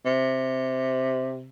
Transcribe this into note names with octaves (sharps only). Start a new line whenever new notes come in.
C3